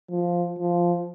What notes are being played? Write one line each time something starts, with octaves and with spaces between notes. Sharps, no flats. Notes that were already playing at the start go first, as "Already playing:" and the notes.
F3
F3